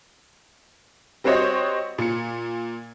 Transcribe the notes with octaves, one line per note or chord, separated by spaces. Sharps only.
G3 C4 F#4 C5 C#5 D#5
A#2 C#7